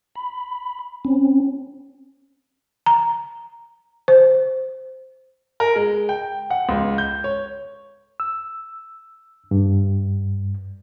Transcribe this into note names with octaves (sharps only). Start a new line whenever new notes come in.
B5
C4 C#4
A#5
C5
A#4
G#3
G5
F#5
C#2
G6
C#5
E6
G2